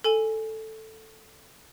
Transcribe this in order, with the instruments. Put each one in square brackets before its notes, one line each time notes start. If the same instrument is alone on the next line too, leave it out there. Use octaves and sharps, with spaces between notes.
[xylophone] A4 G#5 G7